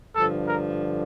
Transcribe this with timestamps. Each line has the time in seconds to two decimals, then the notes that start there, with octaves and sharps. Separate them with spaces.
0.16 G2 D3 F3 A4
0.46 A#4